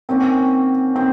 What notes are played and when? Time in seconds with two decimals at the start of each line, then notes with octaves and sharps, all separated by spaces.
0.09 D#3 A#3 C4 C#4 F#4
0.96 D#3 A#3 C4